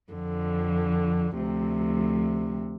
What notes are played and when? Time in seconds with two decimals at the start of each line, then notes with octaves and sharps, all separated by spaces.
0.12 F2 D3 F3
1.35 D2 C3 F3